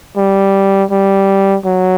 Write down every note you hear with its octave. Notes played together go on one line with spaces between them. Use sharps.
G3
G3
F#3